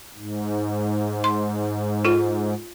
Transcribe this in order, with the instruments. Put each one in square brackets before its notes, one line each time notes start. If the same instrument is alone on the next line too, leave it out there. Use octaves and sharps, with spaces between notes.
[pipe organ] G#2
[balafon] C6
F4 A4